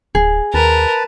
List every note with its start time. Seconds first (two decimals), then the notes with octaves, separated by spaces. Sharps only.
0.15 D1 G#4
0.54 D#2 A#4 B4 A5